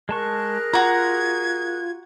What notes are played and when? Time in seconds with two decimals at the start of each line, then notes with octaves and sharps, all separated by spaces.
0.09 G#3 G#4 A#4 A5 C#6 F#6
0.73 F4 F#4 A#5 G#6